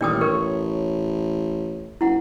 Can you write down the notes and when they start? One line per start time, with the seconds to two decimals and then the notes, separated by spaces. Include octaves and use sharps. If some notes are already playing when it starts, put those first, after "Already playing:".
0.01 A1 A#2 D#3 G3 D5 G5 D#6
0.21 A#4 C#5
2.01 F#1 E4 F#5